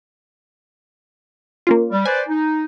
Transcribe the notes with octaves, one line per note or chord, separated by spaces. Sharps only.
A#3 C#4 F4
G3
B4 C5 D5 G#5
D#4